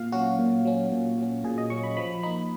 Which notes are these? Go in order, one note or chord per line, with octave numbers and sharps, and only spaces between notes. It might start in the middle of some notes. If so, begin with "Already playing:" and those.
Already playing: A#2 F5
F#3 C#4 F#4
A#2
F#3 C#4
A#2
F#3 C#4
A#2 G#4
D#5
F#3 C#4 C#6
B5
F3 B5
A#3 D#4 B5